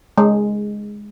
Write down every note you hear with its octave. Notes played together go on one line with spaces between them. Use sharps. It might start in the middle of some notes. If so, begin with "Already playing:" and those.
G#3